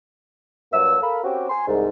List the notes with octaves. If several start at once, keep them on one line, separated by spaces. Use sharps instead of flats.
G2 F#3 A#3 E6
A4 A#4 F5 B5
C4 C#4 F#4 G4
G#5 C6
C2 G#2